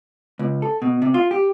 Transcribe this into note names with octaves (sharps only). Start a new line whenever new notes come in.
C#2
A4
B2
C3
F4
G4